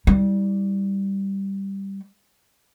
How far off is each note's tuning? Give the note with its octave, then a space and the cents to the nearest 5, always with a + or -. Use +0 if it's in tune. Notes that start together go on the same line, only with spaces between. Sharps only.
G3 +0 E4 -40